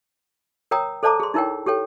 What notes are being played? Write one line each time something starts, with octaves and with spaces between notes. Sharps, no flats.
A#4 C#5 G5 A#5 D#6
A4 C5 D5 A5 A#5 D6
G#4 C6
D#4 E4 A#4 C#5 G5
G4 A4 C#5 G5